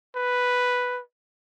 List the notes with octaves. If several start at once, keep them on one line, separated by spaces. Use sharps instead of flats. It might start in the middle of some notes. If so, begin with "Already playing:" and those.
B4